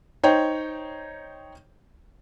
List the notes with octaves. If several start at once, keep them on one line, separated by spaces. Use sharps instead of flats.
D#4 C5 C#5 G5